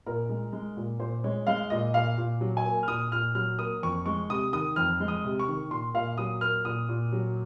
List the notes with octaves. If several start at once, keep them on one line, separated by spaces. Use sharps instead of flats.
A#2 A#4
G#3
G#3
A#2
A#2 C5
G#3 C#5
G#3 F5
A#2 D#5
A#2 F5
A#2
F#3
G#5
A#3
F6
A#2 D#6
A#2 F6
F#3 F6
A#3 D#6
F2 C#6
G#3 C#6
C3 D#6
D#3 D#6
F2 F6
G#3
D#6
C3
C#6
D#3
A#2 C6
A#2 F5
F#3 D#6
A#3 F6
A#2 D#6
A#2
F#3